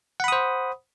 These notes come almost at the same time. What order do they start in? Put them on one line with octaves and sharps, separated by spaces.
F#5 B5 D#6 C5